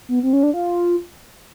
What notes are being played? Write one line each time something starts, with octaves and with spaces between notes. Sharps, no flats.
B3
C4
C#4
D4
F4